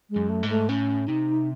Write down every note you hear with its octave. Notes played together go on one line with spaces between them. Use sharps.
G#3
F#2
A3
G#2
A3
A2 C#4
C3 D#4